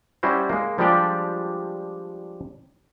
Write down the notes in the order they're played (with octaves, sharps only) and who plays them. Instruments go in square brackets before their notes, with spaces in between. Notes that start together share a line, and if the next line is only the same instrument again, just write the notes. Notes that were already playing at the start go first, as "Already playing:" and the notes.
[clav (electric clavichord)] G3 C#4 E4 F#4 C5
G#3 A#3
F3 G3 G#3 D4 G4 D5